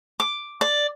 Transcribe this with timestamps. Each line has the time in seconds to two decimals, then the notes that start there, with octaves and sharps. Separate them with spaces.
0.20 D6
0.61 D5